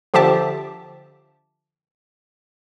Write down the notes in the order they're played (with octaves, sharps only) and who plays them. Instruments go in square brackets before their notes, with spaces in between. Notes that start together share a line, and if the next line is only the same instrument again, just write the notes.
[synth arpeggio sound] D3 F3 G4 E5 A5 D6